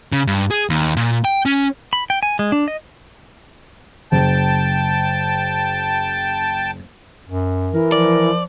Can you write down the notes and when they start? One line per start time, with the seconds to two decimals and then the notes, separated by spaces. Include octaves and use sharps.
0.13 C#3
0.27 G2
0.51 G#4
0.70 D#2
0.97 A#2
1.25 G5
1.46 C#4
1.93 B5
2.10 G5
2.23 G#5
2.39 G#3
2.52 D4
2.68 D#5
4.12 F#1 G5 A5
7.29 F#2
7.72 E3 A#4
7.92 F3 D5